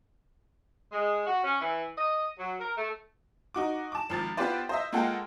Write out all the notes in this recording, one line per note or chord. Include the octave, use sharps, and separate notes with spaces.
G#3
F#4
C#4
E3
D#5
F#3
A#4
A3
D#4 F#4 D6
A5 D6
G#1 F3 A6
B3 F4 G4 B4 C5 D5
C5 D#5 E5
G#3 A#3 F4 A4 F#5 G5